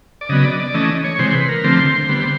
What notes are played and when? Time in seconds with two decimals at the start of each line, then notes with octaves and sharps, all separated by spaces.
0.21 D5
0.29 C#3 F#3 B3 D#5
0.44 D5
0.60 D5
0.74 E3 A3 C#4 D#5
1.04 C#5
1.19 C3 E3 G#3 C5
1.34 B4
1.49 A#4
1.64 D3 F3 A3 C4 C5
2.09 D3 G3 B3